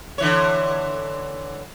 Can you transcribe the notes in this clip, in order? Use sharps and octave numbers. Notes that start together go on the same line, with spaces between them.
D3 E3 C#5